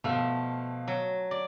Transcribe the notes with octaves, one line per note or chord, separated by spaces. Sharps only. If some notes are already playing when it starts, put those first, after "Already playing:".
B2 F3 A3 F5
F#3
D5